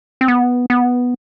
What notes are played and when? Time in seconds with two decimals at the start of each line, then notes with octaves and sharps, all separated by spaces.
0.21 C4
0.28 B3
0.70 B3